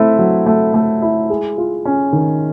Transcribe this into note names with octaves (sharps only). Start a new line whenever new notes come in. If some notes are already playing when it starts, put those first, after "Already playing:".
Already playing: A3 C4 E4
F#3
A3
A3
E4
G#3
F4
C#4
D#3